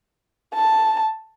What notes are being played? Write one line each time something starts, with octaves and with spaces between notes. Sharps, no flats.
A5